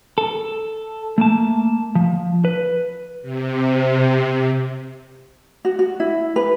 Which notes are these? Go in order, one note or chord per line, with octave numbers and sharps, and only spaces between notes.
A4
A3 A#3 A5
F3
B4
C3
F#4
F#4
E4
B4